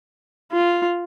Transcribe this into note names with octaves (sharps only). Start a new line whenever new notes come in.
F4